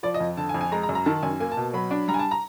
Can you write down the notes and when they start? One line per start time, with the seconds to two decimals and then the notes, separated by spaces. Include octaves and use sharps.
0.03 F3 D5
0.14 D#5
0.20 F2
0.37 D3 A5
0.49 G#5
0.54 F2
0.61 G#5
0.72 G#3 A#5
0.83 A#5
0.89 F#2
0.95 A#5
1.06 D#3 A5
1.23 F#2 G#5
1.40 A#3 G#5
1.52 A5
1.57 B2
1.73 F#3 B5
1.91 D4
2.08 G3 A#5
2.14 G#5
2.19 A5
2.31 A#5